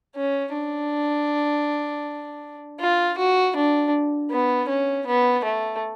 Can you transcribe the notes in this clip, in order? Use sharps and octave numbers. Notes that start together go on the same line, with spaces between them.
C#4
D4
F4
F#4
D4
B3
C#4
B3
A3